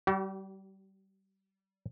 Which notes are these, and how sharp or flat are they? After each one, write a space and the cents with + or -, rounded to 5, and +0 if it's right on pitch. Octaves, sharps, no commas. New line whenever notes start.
G3 -25 F#4 +45